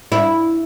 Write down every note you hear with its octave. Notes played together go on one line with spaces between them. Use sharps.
E4